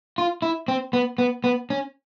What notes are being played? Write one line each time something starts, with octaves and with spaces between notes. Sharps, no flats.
F4
E4
C4
B3
B3
B3
C#4